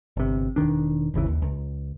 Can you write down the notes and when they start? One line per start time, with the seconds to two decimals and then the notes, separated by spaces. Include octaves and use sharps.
0.17 G1 C3
0.56 E1 B1 D#3 D4
1.14 D#1 G#1 C#3 E3
1.28 D#2
1.42 C#2